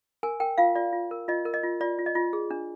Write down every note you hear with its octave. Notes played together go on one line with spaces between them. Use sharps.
A#4 G#5
A#4 G5
F4 F5
F4 D5
F4
A#4
F4 D#5
A#4
D#5
F4
F4 D5
F4
D#5
F4
G#4
D4